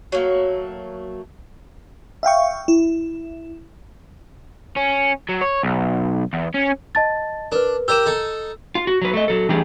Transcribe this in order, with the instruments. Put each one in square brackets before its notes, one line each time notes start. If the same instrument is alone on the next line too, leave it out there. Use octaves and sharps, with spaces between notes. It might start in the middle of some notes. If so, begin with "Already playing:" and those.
[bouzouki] F#3 A3 A#3
[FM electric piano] E5 F5 G5 C#6
E4
[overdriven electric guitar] C#4
F#3
C#5
B1
E2
C#4
[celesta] D#5 A5 A6
[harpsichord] D4 [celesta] A#4 B4
[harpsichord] G4 A#4 D5 [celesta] E6 E7
[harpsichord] D#4 A4
[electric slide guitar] F4
F#4
F#3 B4
A3 D#5
F#3 A4
E3 G3 A3 D4 G4 G#4